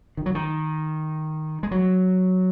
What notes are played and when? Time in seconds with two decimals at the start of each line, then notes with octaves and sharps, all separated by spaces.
0.17 D#3
0.26 F#3
0.35 D#3
1.63 G#3
1.71 F#3